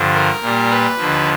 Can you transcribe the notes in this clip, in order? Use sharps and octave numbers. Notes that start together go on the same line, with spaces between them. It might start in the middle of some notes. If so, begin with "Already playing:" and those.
Already playing: G2 D3 F3
A#4
A#2 G3
B4
D#2 D3 F3